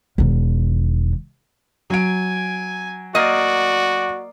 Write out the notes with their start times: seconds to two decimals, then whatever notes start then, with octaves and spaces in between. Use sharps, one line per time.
0.18 E1 D#3
1.90 F#3 G#5 D7
3.15 A#3 F#4 D5 D#5